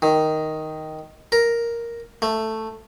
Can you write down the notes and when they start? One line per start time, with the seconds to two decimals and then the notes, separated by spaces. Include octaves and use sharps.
0.02 D#3
1.32 A#4
2.22 A3